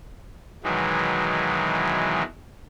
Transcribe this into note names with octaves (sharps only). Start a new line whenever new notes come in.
B2 D#3 E3 F#3 G#3